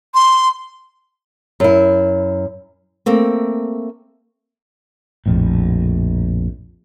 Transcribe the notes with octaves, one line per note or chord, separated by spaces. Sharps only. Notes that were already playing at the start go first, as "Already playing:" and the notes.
C6
F#2 E4
A3 A#3 C4
A#1 F2 A2